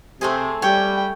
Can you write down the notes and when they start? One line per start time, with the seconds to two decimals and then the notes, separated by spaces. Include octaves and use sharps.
0.21 C3 A3 C4 G#4
0.62 G3 C#5 G5